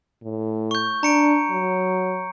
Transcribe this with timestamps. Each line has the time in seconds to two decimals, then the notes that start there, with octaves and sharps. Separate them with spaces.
0.23 A2
0.71 C#6 G6
1.03 D4 A#5 C#7 D7
1.50 F#3